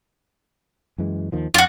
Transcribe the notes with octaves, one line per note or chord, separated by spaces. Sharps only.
F#2 E3 G#3
D#2 D#3 F3
F2 F4 F#4